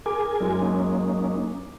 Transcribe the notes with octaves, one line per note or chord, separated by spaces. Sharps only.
G#4 A#4 G#5 D6
F#2 G#3
A#3 C#4 D#4